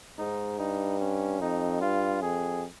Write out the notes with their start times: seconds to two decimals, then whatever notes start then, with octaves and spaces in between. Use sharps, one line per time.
0.19 G#2 D#4
0.59 G2 D#4
1.00 C#4
1.41 F2 D#4
1.81 G2 F4
2.22 F2 G#4